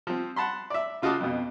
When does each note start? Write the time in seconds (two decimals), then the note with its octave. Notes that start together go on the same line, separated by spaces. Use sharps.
0.07 F3 C4
0.36 F#5 A5 B5 C6
0.70 D5 E5
1.02 C#3 F4 F#4 D#5 A5 D6
1.20 F2 B2